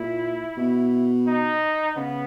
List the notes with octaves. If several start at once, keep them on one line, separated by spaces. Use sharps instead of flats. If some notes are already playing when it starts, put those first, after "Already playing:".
Already playing: A#2 E4
B2
D#4
C#3 B3